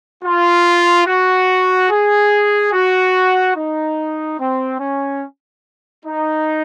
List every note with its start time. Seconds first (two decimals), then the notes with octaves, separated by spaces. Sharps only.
0.23 F4
1.06 F#4
1.89 G#4
2.73 F#4
3.56 D#4
4.39 C4
4.79 C#4
6.04 D#4